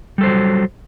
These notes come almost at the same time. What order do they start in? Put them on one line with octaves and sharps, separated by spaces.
G3 A4 C5 F#3